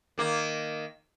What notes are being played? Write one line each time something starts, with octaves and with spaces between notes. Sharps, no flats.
D#3 A#3